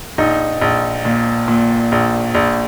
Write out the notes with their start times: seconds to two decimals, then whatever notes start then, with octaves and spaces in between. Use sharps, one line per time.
0.18 A#1 D#4
0.62 A#1
1.05 A#2
1.48 A#2
1.92 A#1
2.35 A#1